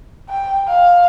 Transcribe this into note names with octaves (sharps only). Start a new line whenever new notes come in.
G5
F5